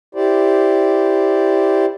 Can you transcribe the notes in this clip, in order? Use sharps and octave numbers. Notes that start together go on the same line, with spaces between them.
E4 G4 C5 D5